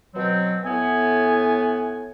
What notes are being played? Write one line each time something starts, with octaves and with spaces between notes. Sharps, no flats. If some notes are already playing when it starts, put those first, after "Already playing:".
B2 F#3 C4
A2 B3 G#5